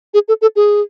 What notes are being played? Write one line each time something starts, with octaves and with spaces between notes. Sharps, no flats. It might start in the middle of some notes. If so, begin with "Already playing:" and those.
G#4
A4
A4
G#4